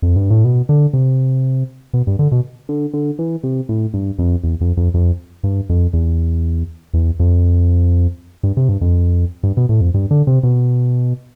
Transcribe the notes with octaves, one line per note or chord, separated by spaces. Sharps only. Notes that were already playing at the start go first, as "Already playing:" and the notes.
F2
G2
A2
B2
D3
C3
B2
G2
D3
B2
D3
D3
E3
C3
A2
G2
F2
E2
F2
F2
F2
G2
F2
E2
E2
F2
G2
C3
G2
F2
G2
B2
A2
F2
G2
D3
C3
B2